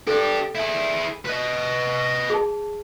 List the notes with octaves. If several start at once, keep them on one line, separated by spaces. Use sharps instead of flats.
D4 G4 A4
E4 G#4
B4 D#5
G#4 A5